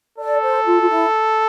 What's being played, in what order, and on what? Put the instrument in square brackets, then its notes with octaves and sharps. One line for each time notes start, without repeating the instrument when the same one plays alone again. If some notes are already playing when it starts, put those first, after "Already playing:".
[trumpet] A4 [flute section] D5
[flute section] C5
F4
F4
E4